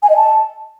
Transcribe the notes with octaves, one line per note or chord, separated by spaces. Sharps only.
G#5
D#5
A5